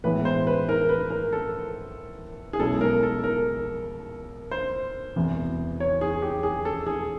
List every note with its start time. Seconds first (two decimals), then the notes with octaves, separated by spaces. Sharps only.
0.04 A2 E3 G#3 B3 B4
0.25 C5
0.47 B4
0.69 A#4
0.89 B4
1.10 A#4
1.33 A4
2.53 G#4
2.59 B1 B2 G#3 C#4 E4 A4
2.81 A#4
3.03 A4
3.24 A#4
4.51 C5
5.16 E1 E2 C3 E3
5.80 C#5
6.01 G#4
6.22 G4
6.43 G#4
6.65 A4
6.87 G#4